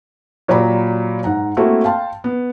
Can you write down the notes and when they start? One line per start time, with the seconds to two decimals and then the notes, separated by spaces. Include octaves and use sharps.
0.48 A#2 F#3 G4 D5 A#5 B5
1.24 G#2 F#5 A#5
1.57 A3 A#3 C4 E4 F#4 A4
1.84 F5 G5 A5 C6
2.24 B3